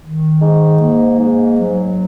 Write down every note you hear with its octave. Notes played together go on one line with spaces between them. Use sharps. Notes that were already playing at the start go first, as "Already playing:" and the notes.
D#3
G#2
A#3
G#2
F#3